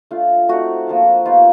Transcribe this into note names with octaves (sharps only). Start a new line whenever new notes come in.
A3 D4 F4
A3 C4 D#4 F#4
F3 A#3 D4 F4
G3 B3 D#4 F4